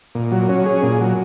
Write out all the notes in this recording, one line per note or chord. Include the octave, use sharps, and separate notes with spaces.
A#2
F#3
C#4
G#4
A#2
F#3